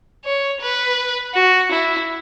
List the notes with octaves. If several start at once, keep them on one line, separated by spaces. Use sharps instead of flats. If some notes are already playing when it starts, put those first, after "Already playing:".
C#5
B4
F#4
E4